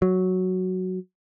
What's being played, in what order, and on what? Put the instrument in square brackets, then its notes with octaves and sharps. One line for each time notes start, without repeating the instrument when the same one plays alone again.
[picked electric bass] F#3